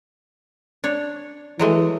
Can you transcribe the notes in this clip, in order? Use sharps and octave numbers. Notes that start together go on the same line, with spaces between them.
D4 C#5
E3 F#3 G#3 A3